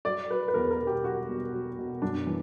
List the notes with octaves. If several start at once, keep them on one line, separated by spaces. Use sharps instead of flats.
F#3 D5
F#3 B4
B4
E2 A#4
A#4
B2
G4
F#3 F#4
B2
F#3
B2
F#2 D4
E3